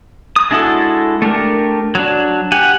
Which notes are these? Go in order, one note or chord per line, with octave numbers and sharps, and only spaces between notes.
D#6
G#3 D4 E4 F#4 A4
A3 D4 G4 A#4
F#3 D4
G4 F#5 G#5